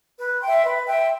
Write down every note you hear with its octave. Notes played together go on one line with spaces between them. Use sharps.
B4
E5 G5 C6
B4
E5 G5 C6